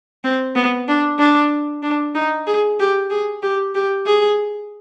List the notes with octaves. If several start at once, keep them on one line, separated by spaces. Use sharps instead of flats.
C4
B3
D4
D4
D4
D#4
G#4
G4
G#4
G4
G4
G#4